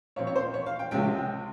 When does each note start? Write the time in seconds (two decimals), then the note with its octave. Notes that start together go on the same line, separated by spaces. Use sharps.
0.16 A#2 F3 C4 C#5
0.27 C#5
0.36 C5
0.54 C#5
0.66 F5
0.79 G5
0.91 C#2 C3 F3 G#3 C#4 G5